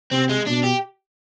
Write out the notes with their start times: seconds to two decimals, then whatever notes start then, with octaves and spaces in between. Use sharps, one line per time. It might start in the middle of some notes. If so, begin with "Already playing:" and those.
0.11 C3 C4
0.29 G#3
0.47 B2 D4
0.64 G4